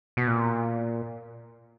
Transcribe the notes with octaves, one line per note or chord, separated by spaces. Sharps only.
B2
A#2